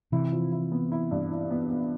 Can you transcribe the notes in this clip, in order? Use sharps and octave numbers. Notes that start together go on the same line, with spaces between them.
C3 E3 E4
F3
E4
B3
E4
G2
E4
B3
B3